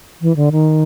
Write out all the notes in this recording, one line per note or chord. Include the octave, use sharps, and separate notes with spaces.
E3
D3
D#3